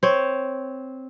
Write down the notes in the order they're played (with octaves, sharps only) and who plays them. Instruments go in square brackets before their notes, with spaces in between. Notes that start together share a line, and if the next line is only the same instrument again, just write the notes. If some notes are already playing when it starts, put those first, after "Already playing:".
[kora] C4 C#5